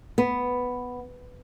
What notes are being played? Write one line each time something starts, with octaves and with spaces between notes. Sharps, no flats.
B3